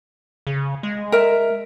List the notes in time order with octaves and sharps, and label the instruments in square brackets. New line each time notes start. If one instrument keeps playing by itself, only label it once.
[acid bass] C#3
G#3
[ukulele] A#4 E5